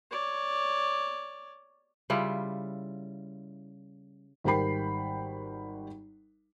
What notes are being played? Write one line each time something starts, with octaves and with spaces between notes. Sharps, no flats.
C#5 D5
C#3 G3 E4 F4
G#1 G3 A#4 G5 B5 C7